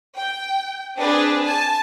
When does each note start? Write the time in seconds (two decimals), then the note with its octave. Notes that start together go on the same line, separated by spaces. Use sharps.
0.16 G5
0.97 C4 D4 G#4 B4
1.45 G#5 A5